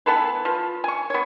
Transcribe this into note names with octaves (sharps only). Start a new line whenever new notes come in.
E3 B3 A4 B4
F3
G#5 C#6
B3 C#5